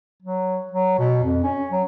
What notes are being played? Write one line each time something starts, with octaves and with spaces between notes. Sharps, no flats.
F#3
F#3
B2
F2
C#4
F#3